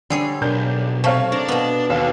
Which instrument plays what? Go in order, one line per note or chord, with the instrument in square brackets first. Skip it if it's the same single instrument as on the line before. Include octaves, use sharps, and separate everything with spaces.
[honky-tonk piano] D3 [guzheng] G3 G#4 C#5
[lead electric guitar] B1 [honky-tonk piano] D4 A#4 G6
[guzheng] C3 A3 [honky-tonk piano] C#5 F5 C#6
[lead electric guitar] D4 D5 [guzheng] A#4
[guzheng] B2 B3
[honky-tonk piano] D#2 F5 [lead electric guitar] F#4 A4